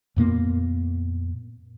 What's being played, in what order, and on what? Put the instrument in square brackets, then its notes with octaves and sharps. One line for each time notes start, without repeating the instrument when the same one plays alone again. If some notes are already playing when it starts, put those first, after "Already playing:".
[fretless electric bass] F2 A#2 A#3 B3